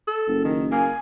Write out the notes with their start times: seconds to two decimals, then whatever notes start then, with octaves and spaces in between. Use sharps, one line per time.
0.08 A4
0.28 F#1
0.45 D#3
0.72 A#3 G#5